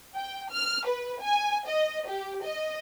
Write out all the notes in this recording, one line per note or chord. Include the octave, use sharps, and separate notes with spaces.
G5
F6
B4
G#5
D#5
G4
D#5